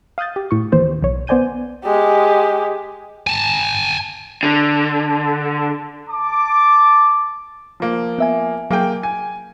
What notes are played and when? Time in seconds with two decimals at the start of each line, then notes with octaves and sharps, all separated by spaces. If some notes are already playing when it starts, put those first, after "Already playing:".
0.18 F5 D#6 F#6 G6 A6
0.36 G4
0.51 A2 C#6
0.72 D#2 E3 C5
1.03 B1 C#5
1.27 B3 C5 D5 G#5 G6 D#7
1.84 G#3 G4
3.27 G#5 A5
4.43 D3
6.10 A5 D6
7.80 F3 A#3
8.19 B3 E5 G#5
8.71 F#3 A#3 G#4 G5
9.03 G#5